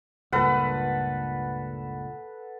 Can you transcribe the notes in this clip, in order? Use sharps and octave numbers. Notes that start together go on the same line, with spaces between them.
C#2 G2 A#2 A4 B4 F#5